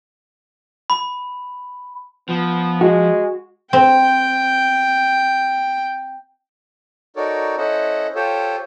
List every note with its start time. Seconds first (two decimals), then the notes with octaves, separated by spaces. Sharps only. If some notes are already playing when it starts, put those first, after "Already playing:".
0.90 B5
2.29 F3 B3
2.81 G#3 F#4
3.73 C4 G5
7.16 D#4 F#4 A4 A#4 C#5 D5
7.58 C#4 E4 A4 C5 D#5 F#5
8.15 F4 G4 A4 C5 C#5